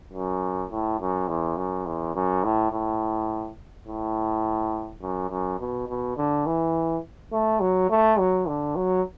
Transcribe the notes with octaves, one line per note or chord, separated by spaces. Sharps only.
F#2
A2
F#2
E2
F#2
E2
F#2
A2
A2
A2
F#2
F#2
B2
B2
D3
E3
A3
F#3
A3
F#3
D3
F#3